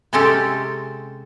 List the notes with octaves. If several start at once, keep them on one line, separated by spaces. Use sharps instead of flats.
C3 G#3 C4 C#4 G4 A4